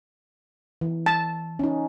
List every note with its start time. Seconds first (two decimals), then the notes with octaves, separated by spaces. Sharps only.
0.81 E3
1.06 A5
1.59 C#4 D#4